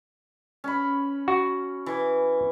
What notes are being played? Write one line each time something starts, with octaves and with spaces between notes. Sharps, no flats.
C#4 B5
F#4
E3